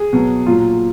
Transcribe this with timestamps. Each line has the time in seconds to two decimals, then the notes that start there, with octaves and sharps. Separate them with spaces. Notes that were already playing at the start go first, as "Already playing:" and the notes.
Already playing: G#4
0.13 B2 F#3
0.46 A#2 F#3 F4